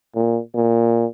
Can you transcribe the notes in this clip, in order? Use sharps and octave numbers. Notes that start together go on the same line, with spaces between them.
A#2
A#2